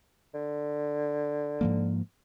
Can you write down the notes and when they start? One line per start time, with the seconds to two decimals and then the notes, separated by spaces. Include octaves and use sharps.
0.34 D3
1.61 G#2 F3 A#3